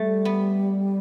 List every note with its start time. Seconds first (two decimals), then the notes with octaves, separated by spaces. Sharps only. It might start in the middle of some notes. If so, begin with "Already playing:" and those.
Already playing: G3 A3
0.25 B3